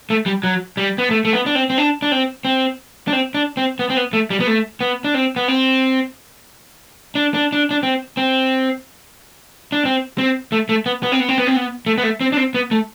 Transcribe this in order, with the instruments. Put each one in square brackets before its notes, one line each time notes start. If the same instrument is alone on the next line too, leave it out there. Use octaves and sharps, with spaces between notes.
[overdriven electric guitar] A3
G3
F#3
G3
B3
A3
A3
B3
D4
C4
C4
D4
D4
C4
C4
D4
C4
D4
C4
B3
C4
B3
A3
G3
B3
A3
B3
D4
C4
B3
C4
D4
D4
D4
D4
C4
C4
D4
C4
C4
A3
A3
B3
B3
C4
B3
C4
B3
C4
B3
A3
B3
A3
C4
D4
C4
B3
A3